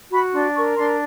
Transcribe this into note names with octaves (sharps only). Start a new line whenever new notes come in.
F#4 B5
D4 C6
A#4 C#6
D4 C6